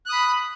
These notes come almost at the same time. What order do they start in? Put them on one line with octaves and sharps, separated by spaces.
F#6 D#6 B5